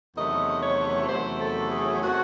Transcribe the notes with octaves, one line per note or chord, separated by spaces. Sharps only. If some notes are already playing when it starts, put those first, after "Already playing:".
E2 C3 D#3 F#3 A3 D#5
C#5
E2 C3 D#3 F#3 A3 C5
A4
G#4
C3 D#3 A3 F#4